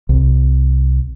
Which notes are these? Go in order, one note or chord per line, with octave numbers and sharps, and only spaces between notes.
C2